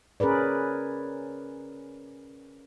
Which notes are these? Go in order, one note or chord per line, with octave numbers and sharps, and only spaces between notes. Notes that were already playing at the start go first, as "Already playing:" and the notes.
C#4 G#4 A#4 B4 D5